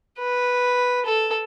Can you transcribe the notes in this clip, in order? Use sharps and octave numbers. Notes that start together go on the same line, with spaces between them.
B4
A4